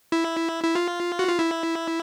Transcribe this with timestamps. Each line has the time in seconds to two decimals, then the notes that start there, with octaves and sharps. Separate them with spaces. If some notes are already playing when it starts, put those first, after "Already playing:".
0.12 E4
0.64 E4
0.75 F4
1.19 F#4
1.29 F4
1.39 E4